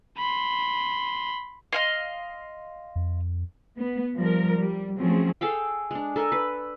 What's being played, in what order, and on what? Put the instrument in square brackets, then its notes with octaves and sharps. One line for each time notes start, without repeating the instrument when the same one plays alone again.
[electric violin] B5 C6
[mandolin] D#5 F5 C6
[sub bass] F2
[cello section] B3
F3 G3 A#4
G3
F3 F#3 A3 C4 C#4 G#4
[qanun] G#4 A4 F5 G5
G#3 D4
A4 A#4 G#5
B4